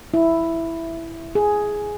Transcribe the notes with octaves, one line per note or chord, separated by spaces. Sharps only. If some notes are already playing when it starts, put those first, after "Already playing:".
E4
G#4